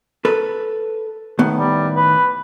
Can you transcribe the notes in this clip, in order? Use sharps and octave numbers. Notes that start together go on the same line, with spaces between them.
A4 B4
A2 D#3 B3
G3
B4